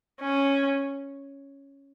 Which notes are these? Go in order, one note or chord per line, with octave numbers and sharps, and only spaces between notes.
C#4